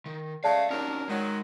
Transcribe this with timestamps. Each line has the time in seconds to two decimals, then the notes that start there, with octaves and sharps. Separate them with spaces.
0.06 D#3
0.44 C#3 G#3 A3 D5 F5 A5
0.70 D#2 F#3 C#4 D4 A#4
1.09 D#3 F#3 G#3